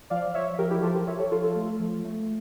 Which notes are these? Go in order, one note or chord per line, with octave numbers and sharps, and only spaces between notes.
F3 D5 F5
F3 C#5 E5
F3 G4 A#4
E4 G4
F3 F4 A4
G4 A#4
F3 C#5 E5
A4 C#5
F3 F4 A4
F4 A4
A3
F3
A3